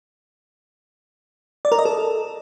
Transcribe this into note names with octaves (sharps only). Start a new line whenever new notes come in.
D5
A#4
D#5
A4